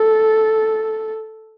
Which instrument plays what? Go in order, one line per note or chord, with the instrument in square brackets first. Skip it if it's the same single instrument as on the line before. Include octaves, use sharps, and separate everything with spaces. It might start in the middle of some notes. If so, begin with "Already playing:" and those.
Already playing: [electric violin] A4